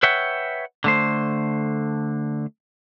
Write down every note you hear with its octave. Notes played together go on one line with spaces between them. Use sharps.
B4 C#5 E5 F#5 G5
D3 A3 C5